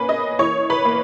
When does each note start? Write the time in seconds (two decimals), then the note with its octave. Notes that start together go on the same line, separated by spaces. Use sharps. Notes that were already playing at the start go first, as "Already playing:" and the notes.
Already playing: A#3 C#4 B4 G#5 B5
0.09 D#5 D#6
0.39 E3 C#5 C#6
0.70 B4 B5
0.85 A#3